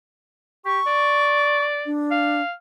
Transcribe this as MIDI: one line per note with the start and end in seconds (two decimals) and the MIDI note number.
0.65 0.79 67
0.65 1.65 85
0.87 1.89 74
1.86 2.41 62
2.11 2.53 77